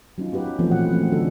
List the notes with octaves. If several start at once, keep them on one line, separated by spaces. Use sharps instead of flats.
F#3 C#4 D#4 F4
B3 F#4 G4 B4
E3 F3 A3 B3 C4 A4
A#2 F#5
F3 G#3 A3 C4 C#4
D3 F#3 D4 A4